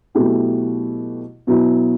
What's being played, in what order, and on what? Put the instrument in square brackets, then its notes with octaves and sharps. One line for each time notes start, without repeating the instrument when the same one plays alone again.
[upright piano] B2 F#3 A3 E4 G4
B2 F#3 B3 E4